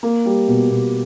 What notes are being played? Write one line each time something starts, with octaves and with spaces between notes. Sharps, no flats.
A#3
G3
B2
B2